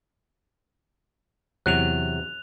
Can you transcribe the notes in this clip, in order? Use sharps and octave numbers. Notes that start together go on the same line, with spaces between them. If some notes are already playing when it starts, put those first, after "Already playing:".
E2 C3 F#3 F#6 F7